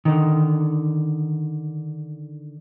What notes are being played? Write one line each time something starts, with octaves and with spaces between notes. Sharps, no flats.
D3 D#3